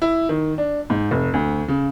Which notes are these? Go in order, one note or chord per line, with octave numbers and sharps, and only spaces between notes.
E4
D#3
D4
G#2
F1
D2
C#3